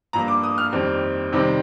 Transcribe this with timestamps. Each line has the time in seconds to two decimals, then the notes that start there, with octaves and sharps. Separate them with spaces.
0.13 G2 F3 A#3 A#5
0.28 D6
0.44 D#6
0.58 F6
0.72 F2 D#3 G3 C4
1.32 C3 D#3 G3 C4